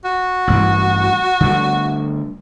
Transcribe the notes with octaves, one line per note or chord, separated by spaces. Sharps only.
F#4
A1 G2 E3
D3 G3 A3